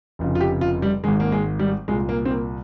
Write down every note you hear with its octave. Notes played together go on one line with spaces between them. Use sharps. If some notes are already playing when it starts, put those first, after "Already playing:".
F1 F2 C#3
F4
G4
F4
G3
G#1 G#2 D#3 G#3
A#3
G#3
G3
C2 A#2 G#3
A#3
C4
A#3